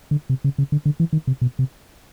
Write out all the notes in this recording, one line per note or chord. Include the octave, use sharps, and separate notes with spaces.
D3
C3
C#3
C#3
D3
D3
E3
D#3
C3
B2
C3